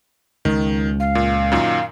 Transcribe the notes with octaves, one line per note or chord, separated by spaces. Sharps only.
C#2 D#3
F5
A#2
F#2 A#2 D#3